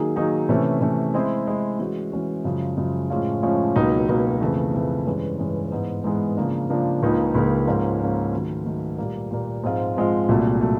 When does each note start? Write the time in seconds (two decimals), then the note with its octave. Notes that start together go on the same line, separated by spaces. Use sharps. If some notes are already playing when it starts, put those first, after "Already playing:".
Already playing: D#3 F#3 A#3 D#4 G#4
0.16 D#3 F#3 A#3 D#4 G#4
0.49 C3 E3 A3 C#4
0.81 C3 E3 A3 C#4
1.14 G#3 C4 E4 G#4
1.47 G#3 C4 E4 G#4
1.79 E3 G#3 C#4 F#4
2.12 E3 G#3 C#4 F#4
2.45 F#2 C#3 F3 G#3
2.77 F#2 C#3 F3 G#3
3.10 A2 F3 G#3 C#4 F4
3.42 A2 F3 G#3 C#4 F4
3.75 C#2 B2 F#3 A#3 D#4
4.09 C#2 B2 F#3 A#3 D#4
4.41 F2 C#3 E3 A3
4.74 F2 C#3 E3 A3
5.07 G2 E3 G#3 C#4
5.38 G2 E3 G#3 C#4
5.72 G#2 E3 G#3 B3
6.04 G#2 E3 G#3 B3
6.37 C#3 F3 A#3 D4
6.69 C#3 F3 A#3 D4
7.02 C#2 C#3 F3 A#3 D#4
7.35 C#2 C#3 F3 A#3 D#4
7.67 G#2 F3 A#3 C#4
8.00 G#2 F3 A#3 C#4
8.33 D#3 F#3 A3
8.66 D#3 F#3 A3
8.98 A#2 G3 A#3
9.31 A#2 G3 A#3
9.63 G#2 F3 G#3 C4 F4
9.97 G#2 F3 G#3 C4 F4
10.29 C2 A#2 F#3 A3
10.61 A#2 F#3 A3